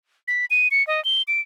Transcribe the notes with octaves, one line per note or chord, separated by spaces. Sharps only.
B6
D#7
C#7
D#5
G7
D7